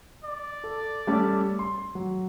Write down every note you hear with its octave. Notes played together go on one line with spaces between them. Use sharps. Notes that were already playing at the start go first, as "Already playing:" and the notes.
D5
A4
G3 A3 C#4
C6
F#3